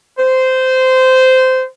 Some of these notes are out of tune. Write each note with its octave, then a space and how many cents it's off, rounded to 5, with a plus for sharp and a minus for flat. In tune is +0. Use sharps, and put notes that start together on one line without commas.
C5 -15